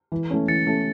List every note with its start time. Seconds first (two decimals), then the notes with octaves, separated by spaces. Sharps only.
0.12 E3
0.30 A3 C#4
0.48 E3 A6 C#7
0.67 A3 C#4